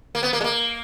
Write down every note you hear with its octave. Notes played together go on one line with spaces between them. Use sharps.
A#3
B3
A#3
G#3
A#3